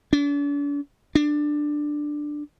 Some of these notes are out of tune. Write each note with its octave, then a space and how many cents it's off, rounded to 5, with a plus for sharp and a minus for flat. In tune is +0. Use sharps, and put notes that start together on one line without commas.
D4 -40
D4 +10